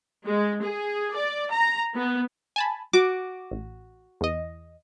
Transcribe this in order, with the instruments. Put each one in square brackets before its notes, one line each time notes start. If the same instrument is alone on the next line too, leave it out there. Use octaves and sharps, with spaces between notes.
[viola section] G#3
G#4
D5
A#5
B3
[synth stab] G#5 A5 B5
[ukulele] F#4 [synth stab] D6
[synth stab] A1
E2 D#5